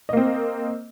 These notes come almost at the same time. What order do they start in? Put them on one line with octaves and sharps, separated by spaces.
D#5 A#3 C4